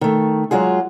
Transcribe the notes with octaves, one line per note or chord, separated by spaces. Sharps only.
D#3 A3
F#3 G#3 F4 F#4 G#4